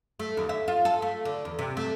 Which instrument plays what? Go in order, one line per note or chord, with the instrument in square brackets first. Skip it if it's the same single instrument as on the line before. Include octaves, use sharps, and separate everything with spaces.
[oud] A3
D#2
E5
F4
A4
A3
D3
E2
C3
A3